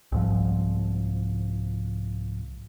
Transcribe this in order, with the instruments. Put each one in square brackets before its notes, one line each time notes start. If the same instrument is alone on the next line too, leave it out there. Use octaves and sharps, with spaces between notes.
[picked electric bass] C2 G#2 F3